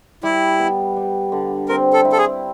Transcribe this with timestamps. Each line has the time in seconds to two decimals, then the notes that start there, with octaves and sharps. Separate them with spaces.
0.23 G3 E4
0.60 B3
0.96 G3
1.32 D3
1.69 C4 A#4
1.93 A4
2.05 E4
2.12 A4
2.18 G#4